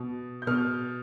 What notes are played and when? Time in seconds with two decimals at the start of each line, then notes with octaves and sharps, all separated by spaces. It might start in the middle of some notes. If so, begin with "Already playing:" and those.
Already playing: B2
0.42 G6
0.47 B2 F6